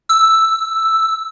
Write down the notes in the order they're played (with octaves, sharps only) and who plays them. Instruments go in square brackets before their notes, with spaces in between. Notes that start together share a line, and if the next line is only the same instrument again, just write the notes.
[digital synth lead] E6